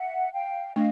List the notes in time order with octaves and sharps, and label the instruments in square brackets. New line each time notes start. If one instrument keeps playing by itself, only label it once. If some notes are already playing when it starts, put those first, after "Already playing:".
Already playing: [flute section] E5 F#5
F5 G5
[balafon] A3 D4 [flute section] D#5 F5